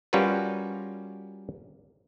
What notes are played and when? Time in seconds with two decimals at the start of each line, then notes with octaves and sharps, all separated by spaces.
0.13 G3 C#4 F4 F#4 A#4 B4